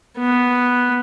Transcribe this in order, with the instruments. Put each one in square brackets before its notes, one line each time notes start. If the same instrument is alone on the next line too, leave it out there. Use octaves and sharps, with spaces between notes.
[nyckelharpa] B3